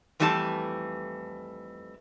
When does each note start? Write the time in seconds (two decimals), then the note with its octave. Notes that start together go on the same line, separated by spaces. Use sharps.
0.20 F2 E3 G3 A3 E4 A5